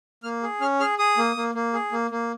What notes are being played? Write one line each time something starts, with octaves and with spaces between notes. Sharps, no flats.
A#3 F6
G#4
C#4 F6
G#4 F6
G#4 D#6
A#3
A#3
A#3
G#4
A#3
A#3